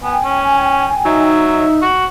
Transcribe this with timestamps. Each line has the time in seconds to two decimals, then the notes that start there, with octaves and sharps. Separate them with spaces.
0.03 B3 G5 G#5
0.24 C#4
1.05 F#3 D#4 E5
1.82 F#4